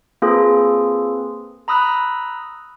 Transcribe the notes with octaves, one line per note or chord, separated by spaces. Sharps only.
A#3 C4 F4 G#4 A4 B4
A#5 B5 D#6 E6 F#6